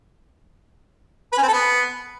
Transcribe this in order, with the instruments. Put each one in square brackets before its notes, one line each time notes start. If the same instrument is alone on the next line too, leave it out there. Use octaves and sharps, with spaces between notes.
[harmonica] B4
C#4
C4
A4
B3